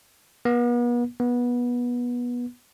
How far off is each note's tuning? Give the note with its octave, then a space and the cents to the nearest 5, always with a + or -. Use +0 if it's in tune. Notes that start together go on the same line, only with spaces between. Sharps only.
B3 -40
B3 -20